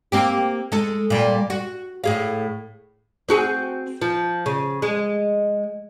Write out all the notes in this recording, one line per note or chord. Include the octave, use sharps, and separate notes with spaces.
A#3 C4 G4
G#3 A4
A#2 G3
F#4
A2 G#4 F5
C4 F#4 G#4
F3
C#3
G#3